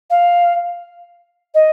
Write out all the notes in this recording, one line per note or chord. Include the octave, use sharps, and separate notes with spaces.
F5
D#5